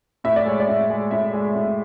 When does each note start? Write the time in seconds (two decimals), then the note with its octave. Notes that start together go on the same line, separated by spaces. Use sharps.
0.24 A2 E5
0.36 D5
0.46 G#3 C#5
0.60 D5
0.68 A2
0.90 G#3
1.11 A2 E5
1.33 G#3
1.55 A2